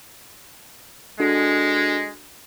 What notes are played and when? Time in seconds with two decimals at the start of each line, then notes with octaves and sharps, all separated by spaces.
1.20 G#3 D4 F#4 A4